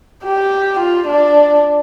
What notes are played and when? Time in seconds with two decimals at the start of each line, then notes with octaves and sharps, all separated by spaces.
0.23 G4
0.80 F4
1.07 D4